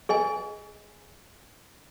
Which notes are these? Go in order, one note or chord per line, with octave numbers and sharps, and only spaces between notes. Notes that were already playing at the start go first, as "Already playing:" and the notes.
G#4 D#5 G#5